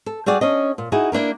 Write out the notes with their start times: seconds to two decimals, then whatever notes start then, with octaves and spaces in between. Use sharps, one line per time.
0.06 A4
0.26 G3 F#4 G#4 D5
0.41 C#4 D4 D#5
0.78 A#2
0.92 D#4 E4 F#4 G#4
1.12 A#3 D4 E4 A#4